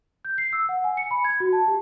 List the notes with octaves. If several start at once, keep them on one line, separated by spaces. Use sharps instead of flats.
G6
C7
E6
F#5
G#5
C#7
B5
G#6
F#4
A5
G4